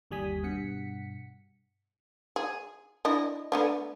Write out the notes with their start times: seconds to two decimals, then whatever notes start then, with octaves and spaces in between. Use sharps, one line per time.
0.11 G1 D#2 G3 G#5 D#6 B6
0.44 G2 B2 F#5 B6 C#7
2.36 G#4
3.05 D4 E4 D#5
3.52 A3 B3 D4